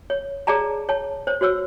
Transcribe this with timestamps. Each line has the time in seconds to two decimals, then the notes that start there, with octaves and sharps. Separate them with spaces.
0.10 C#5
0.47 G#4 C#5 D5 A5 A#5
0.89 C#5 A5
1.27 C5 C#5
1.41 F#4 C5 C#5 E6